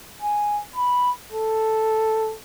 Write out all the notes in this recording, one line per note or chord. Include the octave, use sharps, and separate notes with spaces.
G#5
B5
A4